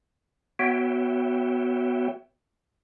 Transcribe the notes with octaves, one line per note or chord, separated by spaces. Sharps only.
B3 F#4 C#5 E5 G5